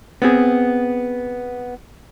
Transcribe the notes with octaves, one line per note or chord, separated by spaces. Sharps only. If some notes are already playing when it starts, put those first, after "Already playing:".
B3 C4 G#4